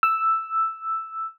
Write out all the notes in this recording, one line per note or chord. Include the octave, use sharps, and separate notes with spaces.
E6